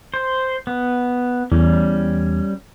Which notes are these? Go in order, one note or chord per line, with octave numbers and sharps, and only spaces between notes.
C5
B3
E2 G3 C#4